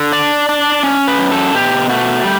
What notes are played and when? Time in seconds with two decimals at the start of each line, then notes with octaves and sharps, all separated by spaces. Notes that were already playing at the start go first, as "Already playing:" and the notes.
Already playing: D3
0.13 D4 D5
0.49 D4
0.83 C#4
1.07 B4
1.19 F#2
1.31 A4
1.54 B2 G4
1.89 A3 F#4
2.24 G3